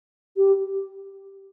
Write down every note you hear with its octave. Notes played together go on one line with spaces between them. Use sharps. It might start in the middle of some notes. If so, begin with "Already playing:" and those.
G4